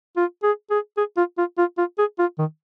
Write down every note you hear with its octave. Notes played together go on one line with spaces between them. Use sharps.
F4
G#4
G#4
G#4
F4
F4
F4
F4
G#4
F4
D#3